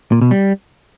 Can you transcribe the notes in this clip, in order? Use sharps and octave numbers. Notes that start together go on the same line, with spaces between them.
A#2
B2
G3